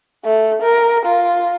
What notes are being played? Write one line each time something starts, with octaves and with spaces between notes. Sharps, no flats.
A3
A#4
F4